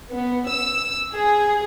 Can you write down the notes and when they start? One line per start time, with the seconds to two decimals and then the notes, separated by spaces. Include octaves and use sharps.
0.11 B3
0.48 E6
1.13 G#4